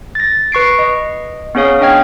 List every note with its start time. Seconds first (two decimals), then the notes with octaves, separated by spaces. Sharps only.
0.15 A6 A#6
0.52 B4 C#6 C7 D7
0.79 D#5
1.55 B3 C#4 G#4 C#5 F5
1.81 D4 D#5 G5 F6 G#6